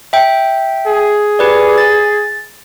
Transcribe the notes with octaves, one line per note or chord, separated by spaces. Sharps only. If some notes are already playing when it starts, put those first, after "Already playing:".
E5 G5
G#4
G4 B4 D5
A6